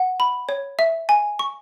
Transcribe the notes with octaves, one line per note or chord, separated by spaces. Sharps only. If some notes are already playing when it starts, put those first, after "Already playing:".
Already playing: F#5
B5
C#5
E5
G#5
C#6